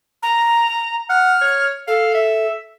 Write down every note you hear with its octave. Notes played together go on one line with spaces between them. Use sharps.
A#5
F#5 F6
C#5
A4 F5
E5